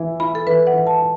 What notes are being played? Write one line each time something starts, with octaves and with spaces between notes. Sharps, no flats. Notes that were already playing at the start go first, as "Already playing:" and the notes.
Already playing: E3 E4
E4 B5
A4
E3 B4
F#5
E3
A5
E4